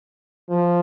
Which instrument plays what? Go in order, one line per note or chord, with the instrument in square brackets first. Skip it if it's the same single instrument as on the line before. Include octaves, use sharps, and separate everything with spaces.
[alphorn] F3